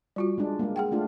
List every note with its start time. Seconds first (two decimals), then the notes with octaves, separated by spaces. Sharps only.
0.16 G3 F4 F#4
0.38 G#3 D4
0.59 G#3 A#3
0.76 G#4 F#5 G5
0.92 A3 D4 F4